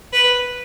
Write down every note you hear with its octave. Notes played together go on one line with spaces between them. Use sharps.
B4